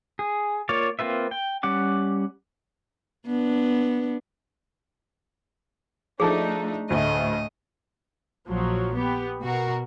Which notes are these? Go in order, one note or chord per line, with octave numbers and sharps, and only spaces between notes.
G#4
A#3 F4 C#5 D5 F5
A#3 C4 F4 B4 E5
G5
G3 C#4 F#5 D6
B3 D4
F3 A3 D4 D#4 G#4 A4 A5
D2 A2 A3 D#5
A#1 F3 F#3
B3 G4
B2 F#4 A#4